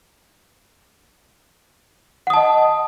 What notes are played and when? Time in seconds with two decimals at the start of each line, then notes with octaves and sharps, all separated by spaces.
2.27 F#5
2.30 D#6
2.34 A5
2.37 D#5